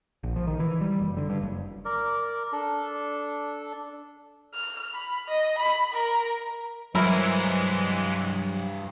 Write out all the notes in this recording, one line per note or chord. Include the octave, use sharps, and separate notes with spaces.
A#1
F3
D#3
E3
G3
F#1
D3
G2
F#1
A#4 D5
D4 A4
F6
B5
D#5
B5
A#4
G2 E3 F#3 G#3 E4 A#4 C5